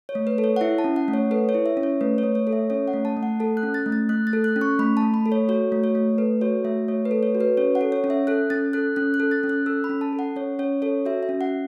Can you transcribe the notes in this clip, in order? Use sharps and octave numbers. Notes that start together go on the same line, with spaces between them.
C#5
A3
B4
A4
C#5
F#5
E4 E5
A5
C#4
F#5
A3
C#5
A4 B4
C#5
E4
E5
C#4
C#5
A3 B4
C#5
A3
C#5
A4
E5
C#4 C#5
F#5
A3
A5
A3
F#5
A4 A5
F#6
C#4
A6
A3
A6
A3 F#6
A6
A4
F#6
C#4
C#6
A3 B5
A5
A3
B5
A4
C#5
F#4 C#5
A3
C#5
A3
A4 B4
F#4 C#5
A3 E5
A3 C#5
B4
A4
C#5
F#4
B4
C#4 C#5
F#5
A4
C#5
C#4
E5
A4 F#6
C#4 A6
A4 F#6
C#4 F#6
F#6
A4
A6
C#4
F#6
A4 E6
B5
C#4
A5
A4
F#5
C#4 C#5
C#4 C#5
A4 C#5
F#4 E5
E5
C#4
F#5